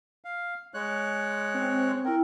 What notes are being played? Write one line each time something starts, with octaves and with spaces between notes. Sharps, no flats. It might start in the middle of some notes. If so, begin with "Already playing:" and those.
F5
G#3 C#5 F#6
C4
E4 A#4 G5